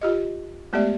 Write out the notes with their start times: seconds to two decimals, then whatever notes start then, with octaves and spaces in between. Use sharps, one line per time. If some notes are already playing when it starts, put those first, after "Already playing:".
0.02 F4 G4 D#5
0.73 G#3 A3 B3 G4 D5 E5